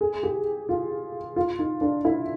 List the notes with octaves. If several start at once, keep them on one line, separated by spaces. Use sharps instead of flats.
G#4
G4
F4
F4
D#4
D4
E4